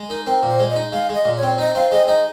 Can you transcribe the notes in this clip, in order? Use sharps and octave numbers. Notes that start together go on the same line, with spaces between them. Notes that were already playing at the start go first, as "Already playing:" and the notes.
Already playing: G#3
D#4 A#4
C4 A#4
A#2
C5
G#3
D#5
D#4
G#3 F5
G#3 D#5
A#2
C#5
C4
D#4 D#5
C4 F5
G#3 D#5
D#4 D#5